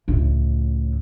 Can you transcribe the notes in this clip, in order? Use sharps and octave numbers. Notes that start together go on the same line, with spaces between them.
C#2 A2